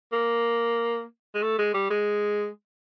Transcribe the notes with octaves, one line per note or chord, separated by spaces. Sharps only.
A#3
G#3
A3
G#3
G3
G#3